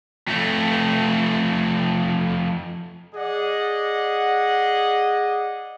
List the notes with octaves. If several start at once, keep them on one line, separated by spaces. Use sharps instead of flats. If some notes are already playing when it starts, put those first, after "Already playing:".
F2 A3
G#4 D5 D#5 F#5